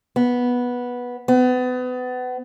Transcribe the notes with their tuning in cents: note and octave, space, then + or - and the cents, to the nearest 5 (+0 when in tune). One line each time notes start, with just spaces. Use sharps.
B3 -10
B3 +30